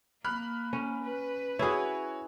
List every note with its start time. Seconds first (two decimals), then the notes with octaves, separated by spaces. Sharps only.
0.25 A#3 B5 F6 F#6
0.73 C#4
1.04 B4
1.59 E4 F#4 G#4 C#5